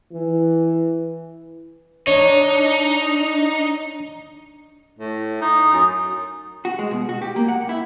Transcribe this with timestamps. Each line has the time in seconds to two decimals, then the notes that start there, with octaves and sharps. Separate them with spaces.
0.13 E3
2.07 D4 D#4 C#5
4.98 A2
5.41 D#4 D#6
5.73 F#2
6.65 F#4
6.79 G#3
6.91 B2
7.09 F#4
7.22 G4
7.36 A#3
7.48 F#5
7.69 E4